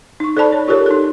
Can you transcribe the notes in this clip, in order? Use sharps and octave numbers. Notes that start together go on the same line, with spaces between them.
D#4 C#6
A4 C5 D5 A5 B5
C#5
F4 G4 A4 A#4 C#5
D#4 A4